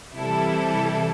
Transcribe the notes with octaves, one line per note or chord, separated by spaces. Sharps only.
C3 E3 G3 E4 A4